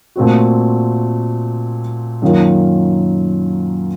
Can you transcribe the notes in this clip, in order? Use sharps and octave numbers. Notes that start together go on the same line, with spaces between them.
A#2 A3 C4 F#4
F#2 D#3 A#3 F4